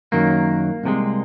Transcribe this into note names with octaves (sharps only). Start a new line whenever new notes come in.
F#2 D#3 F#3 A#3
C2 C3 F3 G#3